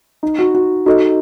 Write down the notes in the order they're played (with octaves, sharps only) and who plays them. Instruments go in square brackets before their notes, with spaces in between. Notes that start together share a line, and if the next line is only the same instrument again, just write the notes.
[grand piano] D#4
F#4
F#4
[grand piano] D#4 [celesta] F#4 A4 D#5